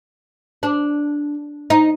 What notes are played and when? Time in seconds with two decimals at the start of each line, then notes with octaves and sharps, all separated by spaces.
0.63 D4
1.70 D#4